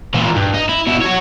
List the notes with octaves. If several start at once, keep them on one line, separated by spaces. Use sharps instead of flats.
A#2 E3
G2
D#4
E4
B2 E4
F#4 C#5